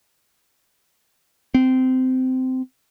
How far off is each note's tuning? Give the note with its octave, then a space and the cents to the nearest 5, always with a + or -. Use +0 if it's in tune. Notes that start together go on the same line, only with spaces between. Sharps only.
C4 -20